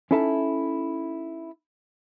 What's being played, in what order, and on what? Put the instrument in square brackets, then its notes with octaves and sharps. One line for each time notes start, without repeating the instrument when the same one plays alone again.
[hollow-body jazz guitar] C#4 D#4 E4 A4 E5 A5